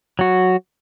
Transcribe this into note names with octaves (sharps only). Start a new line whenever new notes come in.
F#3 F#4